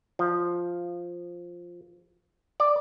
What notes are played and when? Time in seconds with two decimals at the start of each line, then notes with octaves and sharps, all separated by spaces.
0.19 F3
2.60 D5